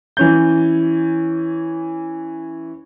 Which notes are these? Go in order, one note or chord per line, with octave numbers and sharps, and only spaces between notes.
E3 C#4 G6